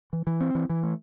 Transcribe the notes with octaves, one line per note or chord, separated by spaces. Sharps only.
E3
E3
C4
E3
E3
A3